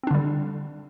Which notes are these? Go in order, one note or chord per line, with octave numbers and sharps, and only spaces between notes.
D3 G3 C4 D4